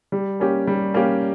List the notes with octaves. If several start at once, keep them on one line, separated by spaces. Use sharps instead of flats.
G3
A#3 C#4 G4
G3
A#3 C#4 G4